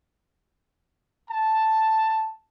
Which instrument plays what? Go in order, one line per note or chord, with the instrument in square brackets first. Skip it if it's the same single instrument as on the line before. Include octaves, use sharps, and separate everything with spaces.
[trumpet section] A5